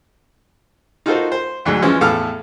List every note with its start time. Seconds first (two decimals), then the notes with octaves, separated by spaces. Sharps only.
1.06 D#4 F4 F#4 A4 A#4 C5
1.32 C5
1.65 D2 G#2 D3 F#3
1.82 E3 F3 G#3 C#4
2.01 E2 A2 A4 F5 F6